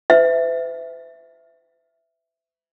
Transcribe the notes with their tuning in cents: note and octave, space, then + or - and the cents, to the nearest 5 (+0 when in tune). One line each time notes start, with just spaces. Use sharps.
B4 +45 E5 +0